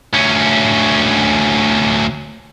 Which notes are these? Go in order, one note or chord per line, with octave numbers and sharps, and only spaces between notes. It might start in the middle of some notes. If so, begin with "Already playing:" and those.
D2 C#4